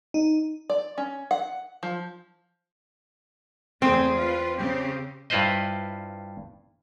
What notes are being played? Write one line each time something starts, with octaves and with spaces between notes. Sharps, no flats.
D#4
D5
C#4
F#5
F3
E2 A3 C4 G#4
F4 B4
C#3 C4 G4
G2 E4 F4 B4 C5 D#5